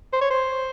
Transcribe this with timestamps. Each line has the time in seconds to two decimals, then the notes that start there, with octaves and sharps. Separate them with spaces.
0.13 C5
0.21 C#5
0.30 C5